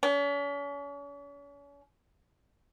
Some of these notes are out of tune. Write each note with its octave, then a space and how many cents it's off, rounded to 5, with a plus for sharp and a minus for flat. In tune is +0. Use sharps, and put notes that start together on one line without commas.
C#4 +40